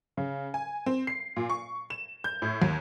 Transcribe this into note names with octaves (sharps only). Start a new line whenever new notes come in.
C#3
G#5
C4
C7
A#2
C#6
E7
G6
A2
D#2